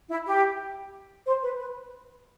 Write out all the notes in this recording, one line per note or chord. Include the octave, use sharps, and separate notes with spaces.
E4
G4
C5
B4
B4